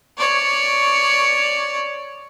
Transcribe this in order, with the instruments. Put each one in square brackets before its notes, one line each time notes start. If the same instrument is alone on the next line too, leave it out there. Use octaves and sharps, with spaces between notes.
[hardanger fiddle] C#5 D5